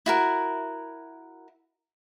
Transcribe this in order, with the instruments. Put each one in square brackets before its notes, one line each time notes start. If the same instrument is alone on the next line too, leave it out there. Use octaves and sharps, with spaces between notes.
[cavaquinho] E4 F#4 A#4